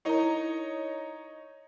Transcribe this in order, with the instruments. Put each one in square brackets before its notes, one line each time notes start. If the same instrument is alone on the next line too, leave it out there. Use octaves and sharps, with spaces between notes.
[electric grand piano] D#4 C#5 D#5 [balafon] E4 A#4 A#5